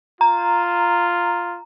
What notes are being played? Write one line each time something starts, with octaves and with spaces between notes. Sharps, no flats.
F4 A#5